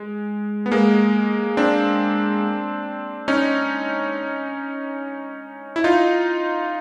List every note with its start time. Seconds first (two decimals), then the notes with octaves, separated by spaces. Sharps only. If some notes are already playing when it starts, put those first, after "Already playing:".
Already playing: G#3
0.66 B3
0.72 G#3 A#3
1.57 C4 D4
3.28 C#4 D#4
5.76 E4
5.84 D#4 F4